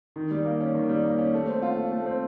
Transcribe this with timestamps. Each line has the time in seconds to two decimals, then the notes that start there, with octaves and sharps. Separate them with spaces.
0.16 D#3
0.31 G3
0.45 A#3
0.60 C#4
0.75 D#3
0.89 G3
1.04 A#3
1.19 C#4
1.34 A3
1.48 C4
1.62 F4
1.76 A3
1.92 A3
2.06 C4